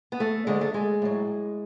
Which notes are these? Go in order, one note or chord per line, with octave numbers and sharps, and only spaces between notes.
B3
A3
D2 D3 F#3 G#3
A3
G#3
A2 F#3